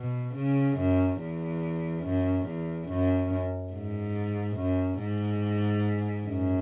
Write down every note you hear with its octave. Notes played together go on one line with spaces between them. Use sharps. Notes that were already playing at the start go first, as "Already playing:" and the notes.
Already playing: B2
C#3
F#2
E2
F#2
E2
F#2
G#2
F#2
G#2
F#2